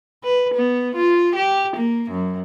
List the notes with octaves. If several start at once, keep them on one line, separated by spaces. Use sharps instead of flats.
B4
B3
F4
G4
A#3
F#2